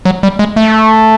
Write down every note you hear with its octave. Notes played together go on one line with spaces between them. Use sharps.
F#3
G3
G#3
A3